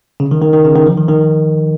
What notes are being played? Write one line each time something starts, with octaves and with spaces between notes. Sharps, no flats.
C#3
D#3
D#3
D#3
C#3
D#3
F3
D#3
D#3